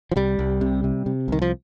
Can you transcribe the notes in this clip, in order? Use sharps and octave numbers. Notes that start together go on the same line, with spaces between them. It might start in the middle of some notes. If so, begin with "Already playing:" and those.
F3
C2 G3
C2
C3
C3
C3
C2 D#3
F3